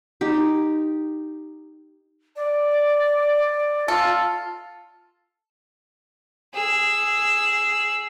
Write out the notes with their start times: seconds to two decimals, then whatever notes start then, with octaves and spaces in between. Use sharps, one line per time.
0.21 D#4 G4
2.36 D5
3.88 F4 A4
6.54 G#4 E6